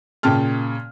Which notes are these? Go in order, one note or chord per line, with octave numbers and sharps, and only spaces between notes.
A#2 C#3 G5 A5 F6